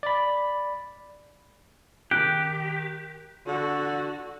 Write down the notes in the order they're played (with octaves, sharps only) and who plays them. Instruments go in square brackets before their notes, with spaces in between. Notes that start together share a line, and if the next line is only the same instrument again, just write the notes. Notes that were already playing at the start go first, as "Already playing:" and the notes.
[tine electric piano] D5 B5
[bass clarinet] D#3 [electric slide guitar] G4 [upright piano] F#6 [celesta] D7
[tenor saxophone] D3 [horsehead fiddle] F#4